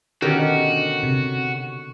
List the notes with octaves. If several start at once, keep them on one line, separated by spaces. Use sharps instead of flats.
B2 D3 D#3 C#4 F#4 G4 A#4
C3